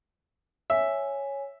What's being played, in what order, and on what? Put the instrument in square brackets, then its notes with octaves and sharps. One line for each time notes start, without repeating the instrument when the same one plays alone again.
[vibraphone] C#5 G#5 [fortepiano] E5